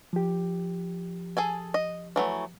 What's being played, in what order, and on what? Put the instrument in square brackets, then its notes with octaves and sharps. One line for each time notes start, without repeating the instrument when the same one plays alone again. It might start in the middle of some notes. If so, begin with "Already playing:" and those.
[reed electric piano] F3 G4
[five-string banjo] G#4 A4 G#5
D#5
E3 F#3 A3